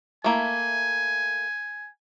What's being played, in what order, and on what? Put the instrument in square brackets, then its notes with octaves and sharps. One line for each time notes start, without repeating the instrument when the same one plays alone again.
[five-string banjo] A3 A#3 E4 [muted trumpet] G#5